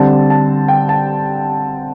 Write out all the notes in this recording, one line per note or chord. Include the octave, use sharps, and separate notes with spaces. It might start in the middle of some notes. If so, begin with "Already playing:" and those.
Already playing: D3 G3 C4 A5
A5
G5
A5